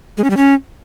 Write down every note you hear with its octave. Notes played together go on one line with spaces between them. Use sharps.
G#3
C#4
G3
C#4